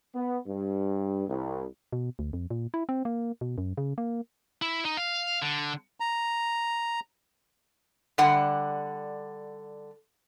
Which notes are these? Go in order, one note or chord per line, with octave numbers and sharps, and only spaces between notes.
B3
G2
C2
B2
D2
F2
A#2
E4
C4
A#3
B2
F#2
C#3
A#3
E4
D#4
F5
D3
A#5
D3 G3 F#5